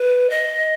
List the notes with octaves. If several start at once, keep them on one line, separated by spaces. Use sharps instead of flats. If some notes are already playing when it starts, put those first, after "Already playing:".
Already playing: B4
D#5